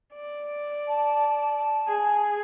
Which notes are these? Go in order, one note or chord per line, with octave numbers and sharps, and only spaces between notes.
D5
A5
G#4